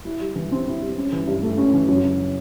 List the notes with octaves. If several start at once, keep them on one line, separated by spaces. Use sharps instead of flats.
E4
G3
E3
C4
E4
G3
C#4
E3
G2
A3
C#4
E3
F#2
C#3